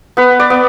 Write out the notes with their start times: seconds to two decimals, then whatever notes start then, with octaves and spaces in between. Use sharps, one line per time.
0.17 B3 B4
0.40 D5
0.50 B3